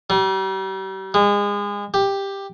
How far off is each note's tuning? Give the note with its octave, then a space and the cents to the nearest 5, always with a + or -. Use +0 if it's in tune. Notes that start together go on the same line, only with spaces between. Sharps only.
G3 -40
G#3 -30
G4 +10